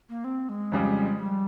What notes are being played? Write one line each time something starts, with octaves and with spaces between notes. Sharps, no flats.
A#3
C4
G#3
F2 C#3 G3
G3